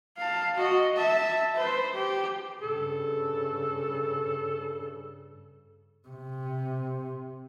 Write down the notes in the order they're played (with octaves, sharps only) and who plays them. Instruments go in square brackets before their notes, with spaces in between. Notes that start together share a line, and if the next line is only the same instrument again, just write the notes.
[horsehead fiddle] F5 A5
F#4 D#5
E5 A5
B4 C5
G4
[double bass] G2 C#3 [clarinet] A4
[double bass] C3